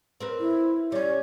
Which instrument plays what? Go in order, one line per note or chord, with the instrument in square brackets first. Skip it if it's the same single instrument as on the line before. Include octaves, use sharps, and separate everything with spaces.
[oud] C4 A#4 B4
[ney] E4
[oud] G3 C#4 [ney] C#5